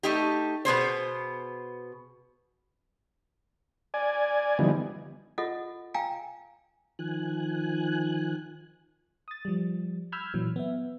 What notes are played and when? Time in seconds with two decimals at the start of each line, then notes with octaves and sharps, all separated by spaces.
0.03 A3 D#4 G4
0.65 B2 B3 G#4 C5
3.94 D5 G#5
4.59 D3 E3 F3 G3 B3 D#4
5.38 F4 A4 D#5 F#5
5.94 F5 G5 G#5 A#5
6.99 D#3 F3 G#5 F#6
9.28 D#6 A6
9.45 F3 G3
10.12 B5 E6 F6 G6 G#6
10.34 A#2 E3 F#3
10.56 B3 E5